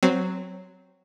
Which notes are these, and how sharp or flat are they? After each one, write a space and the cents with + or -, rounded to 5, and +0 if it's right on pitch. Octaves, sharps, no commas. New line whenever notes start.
F#3 +0 C4 -10